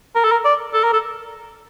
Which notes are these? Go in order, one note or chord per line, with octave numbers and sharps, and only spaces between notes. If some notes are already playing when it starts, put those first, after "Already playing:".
A#4
A4
A#4
D5
A4
A#4
A4